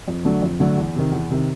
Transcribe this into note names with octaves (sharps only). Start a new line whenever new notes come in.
F2
D3 F#3 A3 D4
F2
D3 F#3 A3 D4
E2
C3 D#3
E2
C3 D#3